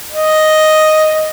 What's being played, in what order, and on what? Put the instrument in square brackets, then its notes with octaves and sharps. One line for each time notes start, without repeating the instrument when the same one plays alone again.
[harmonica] D#5